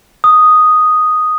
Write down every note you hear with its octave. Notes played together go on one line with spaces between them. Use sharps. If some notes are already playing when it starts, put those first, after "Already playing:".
D#6